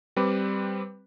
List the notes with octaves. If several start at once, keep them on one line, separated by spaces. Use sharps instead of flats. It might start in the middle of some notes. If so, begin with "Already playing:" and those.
G3 C4 B4 D6